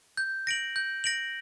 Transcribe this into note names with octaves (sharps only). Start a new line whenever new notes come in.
G6
A#6 D7 F#7
G6
A#6 D7 F#7